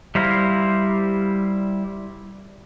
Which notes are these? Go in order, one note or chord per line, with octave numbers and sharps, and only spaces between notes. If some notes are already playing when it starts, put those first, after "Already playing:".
G3 E4 C5 F5 A#5